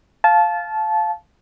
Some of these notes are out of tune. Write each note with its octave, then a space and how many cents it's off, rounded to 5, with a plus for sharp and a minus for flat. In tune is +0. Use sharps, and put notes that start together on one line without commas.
F5 +0 A5 -20